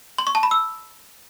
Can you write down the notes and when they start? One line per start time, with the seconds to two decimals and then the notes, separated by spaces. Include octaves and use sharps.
0.18 C6
0.27 C#6
0.35 A5
0.43 B5
0.51 E6